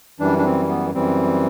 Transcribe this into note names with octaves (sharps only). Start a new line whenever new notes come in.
F#2 E3 G3 D4
D4
C4
B3
F#2 E3 G3 C4